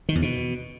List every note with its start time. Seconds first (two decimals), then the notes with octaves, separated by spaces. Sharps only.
0.09 D#3
0.15 E2
0.22 B2